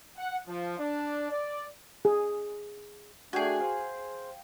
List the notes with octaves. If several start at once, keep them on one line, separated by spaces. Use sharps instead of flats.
F#5
F3
D4
D5
G#4
A3 D4 F#4 G#4 G5 G#5
C5 F5